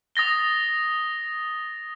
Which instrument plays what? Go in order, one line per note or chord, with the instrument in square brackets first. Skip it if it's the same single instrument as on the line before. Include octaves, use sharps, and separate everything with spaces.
[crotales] D#6 A6 A#6 G7